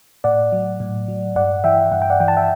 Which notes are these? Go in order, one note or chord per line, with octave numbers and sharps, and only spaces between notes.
A2 D5 F#5
F#3
A2
F#3
G2 D5 F#5
E3 E5 G5
G2 F#5
G5
D5 F#5
E3 G5
A5
E5 G5